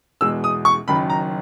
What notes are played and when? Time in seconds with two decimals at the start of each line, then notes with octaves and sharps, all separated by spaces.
0.21 E2 B2 G#3 E6
0.44 D#6
0.65 C#6
0.88 F#1 F#2 D#3 B5
1.10 A#5